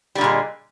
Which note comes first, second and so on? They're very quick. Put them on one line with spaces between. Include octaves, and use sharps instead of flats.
G3 D3 A#2 G#3